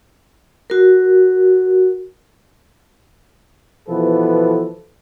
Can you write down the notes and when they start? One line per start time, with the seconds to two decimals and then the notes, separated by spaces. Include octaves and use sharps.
0.70 F#4 A#4
3.89 B2 E3 F3 B3 A4 B4